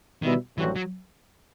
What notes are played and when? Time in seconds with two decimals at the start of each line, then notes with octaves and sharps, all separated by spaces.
0.22 B2 D#3 G3 B3 E4
0.58 A1 G2 E3 F#3 C4 F#4
0.76 F#3